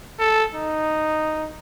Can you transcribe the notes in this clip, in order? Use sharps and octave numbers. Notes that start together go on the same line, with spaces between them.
A4
D#4